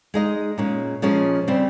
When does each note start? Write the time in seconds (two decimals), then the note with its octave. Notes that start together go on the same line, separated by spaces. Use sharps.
0.14 G#3 D#4 G#4 D#5
0.58 A#2 G#3 C#4
1.02 A#2 F3 G#3 C#4 G#4
1.48 C#3 G3 C4